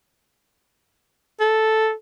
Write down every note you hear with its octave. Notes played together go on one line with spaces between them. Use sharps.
A4